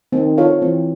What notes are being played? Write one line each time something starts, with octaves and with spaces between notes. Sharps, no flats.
D#3 C4
F4 A4 C#5 F5
E3 C4